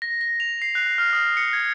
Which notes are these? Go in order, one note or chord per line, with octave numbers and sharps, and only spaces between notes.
A#6
A#6
F7
C7
F#6
F6
D#6
C#7
G#6